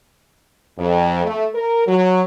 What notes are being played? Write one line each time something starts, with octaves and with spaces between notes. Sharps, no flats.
F2
A3
A#4
F#3